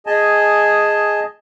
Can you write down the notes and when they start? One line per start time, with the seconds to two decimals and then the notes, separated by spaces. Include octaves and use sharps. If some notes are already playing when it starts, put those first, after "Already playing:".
0.07 G#4 D#5 G#5 A5